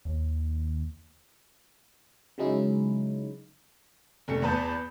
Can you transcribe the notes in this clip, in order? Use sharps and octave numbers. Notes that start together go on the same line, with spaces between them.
D#2
C#3 F#3 G#3 C#4 D#4 E4
F1 A3 C#7
E2 B3 B4 A5 G6